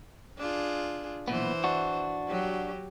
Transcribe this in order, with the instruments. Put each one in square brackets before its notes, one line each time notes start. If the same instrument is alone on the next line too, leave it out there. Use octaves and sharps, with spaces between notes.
[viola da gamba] D4 F4 G#4
[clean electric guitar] B1 A#2 B3 [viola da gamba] E3 C5
[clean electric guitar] D4 F#4
[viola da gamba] F#3 G4